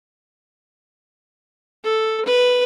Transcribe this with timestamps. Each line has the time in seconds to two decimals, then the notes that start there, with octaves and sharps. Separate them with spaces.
1.84 A4
2.26 B4